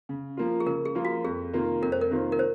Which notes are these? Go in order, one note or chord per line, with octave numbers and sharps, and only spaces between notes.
C#3
F3 A#3 F4
G#4
C#3 A#4
G#4
F3 A#3 F4
F#4
F2 G#4
C3 D#3 A#3 F4
F2 A#4
C5
A#4
C3 D#3 A#3 F4
A#4
C5